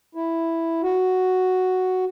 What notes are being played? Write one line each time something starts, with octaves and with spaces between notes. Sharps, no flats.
E4
F#4